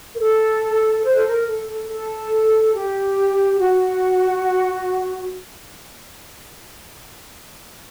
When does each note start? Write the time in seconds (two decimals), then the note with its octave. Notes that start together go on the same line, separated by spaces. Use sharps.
0.15 A#4
0.19 A4
1.04 C5
1.15 A4
1.25 A#4
1.47 A4
1.67 A4
1.89 A4
2.73 G4
3.59 F#4